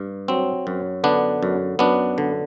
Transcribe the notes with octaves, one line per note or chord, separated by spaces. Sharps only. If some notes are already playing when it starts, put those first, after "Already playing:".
Already playing: G2
F#3 C4
F#2
D3 B3 D4
F#2
F#2 B3 D4
D3